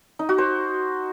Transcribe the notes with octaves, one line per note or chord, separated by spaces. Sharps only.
D#4
F#4
C5